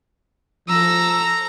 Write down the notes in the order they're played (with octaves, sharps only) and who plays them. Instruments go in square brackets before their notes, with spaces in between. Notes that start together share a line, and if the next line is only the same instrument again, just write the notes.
[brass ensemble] F3 [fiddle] A4 A#5 [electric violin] E6